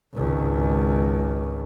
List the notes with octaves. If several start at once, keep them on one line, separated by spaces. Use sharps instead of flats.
G#1 C#2